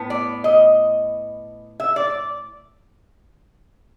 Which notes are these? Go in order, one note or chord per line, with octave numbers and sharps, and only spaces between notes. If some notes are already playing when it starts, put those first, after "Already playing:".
Already playing: A2 B3
D5
D#5
E5
D5